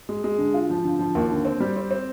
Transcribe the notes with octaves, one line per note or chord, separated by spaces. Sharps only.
G#3
G#3
D3
F4
F3
D3
F3
D#2
D3
C4
G3
C4
C4